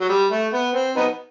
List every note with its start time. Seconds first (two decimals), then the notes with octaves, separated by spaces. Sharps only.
0.01 F#3
0.09 G3
0.31 A3
0.54 B3
0.75 C4
0.97 B3 D#4